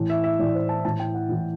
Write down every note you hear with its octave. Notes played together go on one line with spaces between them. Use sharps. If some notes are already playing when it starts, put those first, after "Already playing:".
Already playing: A2 E3
E5
E5
A2 E3 D5
C5
A5
A2 E3 A5
G5
F#5
A2 E3